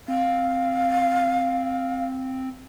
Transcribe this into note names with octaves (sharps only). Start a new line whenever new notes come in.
C4 F5